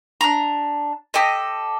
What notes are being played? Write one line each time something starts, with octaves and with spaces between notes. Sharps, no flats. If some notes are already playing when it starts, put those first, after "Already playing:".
D4 A#5
G4 A4 D#5